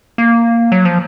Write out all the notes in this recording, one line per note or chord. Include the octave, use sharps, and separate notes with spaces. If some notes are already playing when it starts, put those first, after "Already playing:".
A#3
F#3
F3